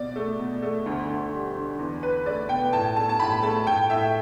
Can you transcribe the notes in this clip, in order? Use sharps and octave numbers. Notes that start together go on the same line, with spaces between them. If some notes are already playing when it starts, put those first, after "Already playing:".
Already playing: B2 D5
A3
B2
A3
D2
D2
G3
D3
E2
E2 B4
A3 D5
B2 G5
A2 A5
A3 A5
A5
A2 B5
A3 A5
A2 G5
A2 E5